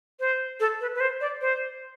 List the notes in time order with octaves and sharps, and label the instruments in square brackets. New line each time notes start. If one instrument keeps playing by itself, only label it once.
[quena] C5
A4
B4
B4
C5
D5
C5